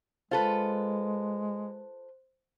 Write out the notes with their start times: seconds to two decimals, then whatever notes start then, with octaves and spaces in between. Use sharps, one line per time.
0.31 G#3 F4 A4 B4 C5